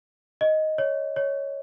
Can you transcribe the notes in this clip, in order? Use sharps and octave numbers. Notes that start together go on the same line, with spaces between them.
D#5
C#5
C#5